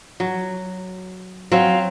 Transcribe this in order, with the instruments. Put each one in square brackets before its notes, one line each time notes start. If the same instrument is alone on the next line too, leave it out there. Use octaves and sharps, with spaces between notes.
[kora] F#3
[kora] F#3 C4 [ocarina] F5